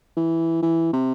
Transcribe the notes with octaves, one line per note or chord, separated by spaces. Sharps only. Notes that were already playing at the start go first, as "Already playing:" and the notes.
E3
E3
C3